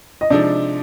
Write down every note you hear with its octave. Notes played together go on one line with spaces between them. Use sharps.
D#5
C3 F3 G#3 D4 D#4 D5